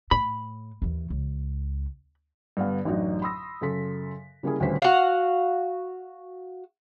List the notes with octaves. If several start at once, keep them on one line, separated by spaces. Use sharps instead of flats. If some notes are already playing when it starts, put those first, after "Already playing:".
A2 B5
D#2 E3
C#2
G2 D3 B3 F5
A1 F#2 F#3 D4 D#4 F#4
B5 C6 D#6 E6 A#6
F#2 C#3 A4 C6 B6
C#3 G3 A#3 C#4 E4 G#4
D#1 D2 C#4 B4 C5 B6
F#4 F5